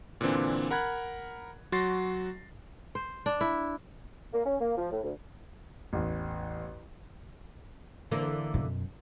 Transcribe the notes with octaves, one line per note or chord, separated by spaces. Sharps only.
A#2 D3 E3 C4 D4
A#4 F#5 B5 F#6 G#6
F#3 F#4 C6 A6 A#6 C7
C5
D4
E4
A#3
C#4
A#3
F3
A2
D2
A1 E2
D3 E3 A#3
F#2 B2